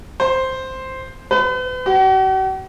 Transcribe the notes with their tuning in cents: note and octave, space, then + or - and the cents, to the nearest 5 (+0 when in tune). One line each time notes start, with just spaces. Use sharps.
C5 +0
B4 +40
F#4 +45